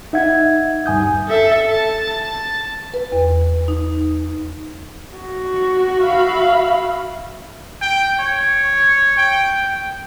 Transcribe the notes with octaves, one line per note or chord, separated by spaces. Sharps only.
D#4 E5 F#5 G#6
D2 G2 G#5 D#6 G6
A4 E5
A5
A5
B4
E2
D#4
F#4
E5 F5 B5
G5
C#5
G5